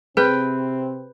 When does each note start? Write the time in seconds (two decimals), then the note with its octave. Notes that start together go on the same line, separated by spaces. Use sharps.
0.17 C3 C4 G#4 B4 G5